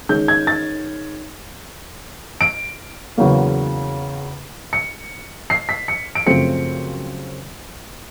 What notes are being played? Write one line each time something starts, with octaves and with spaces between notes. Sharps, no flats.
D#3 G#3 C#4 G6
G#6
A6
D7
E2 C#3 F#3 A#3
C#7
C7
B6
C#7
D7
F#2 C#3 F3 A3 C4 C#7